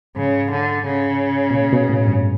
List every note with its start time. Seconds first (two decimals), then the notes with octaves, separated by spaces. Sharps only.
0.16 G#2 C#3
0.51 D3
0.86 C#3
1.51 B2
1.55 A#2
1.72 B2
1.89 A2
2.07 G2